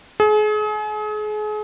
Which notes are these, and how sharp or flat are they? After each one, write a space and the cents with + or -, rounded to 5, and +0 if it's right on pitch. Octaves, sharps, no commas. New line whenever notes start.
G#4 +35